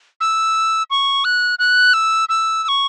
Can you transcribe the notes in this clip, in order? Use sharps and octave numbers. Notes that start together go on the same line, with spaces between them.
E6
C#6
F#6
F#6
E6
E6
E6
C#6